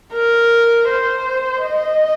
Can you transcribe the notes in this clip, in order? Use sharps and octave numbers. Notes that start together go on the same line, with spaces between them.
A#4
C5
D#5